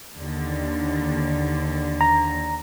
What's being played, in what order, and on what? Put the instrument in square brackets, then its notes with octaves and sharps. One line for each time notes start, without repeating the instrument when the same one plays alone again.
[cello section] D#2 D3
[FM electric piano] A#5